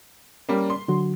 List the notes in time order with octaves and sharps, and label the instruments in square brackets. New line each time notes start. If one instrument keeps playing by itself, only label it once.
[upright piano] G3 A#3 [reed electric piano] C#4 D5
[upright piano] C6
[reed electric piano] D3 F#3 F#4